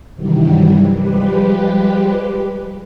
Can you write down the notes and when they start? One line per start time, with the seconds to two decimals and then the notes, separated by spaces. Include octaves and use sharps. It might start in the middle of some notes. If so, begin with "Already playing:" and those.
0.14 G2 C3 D#3 E3 F#3 G3
0.93 F3 G3 G#3 G4 B4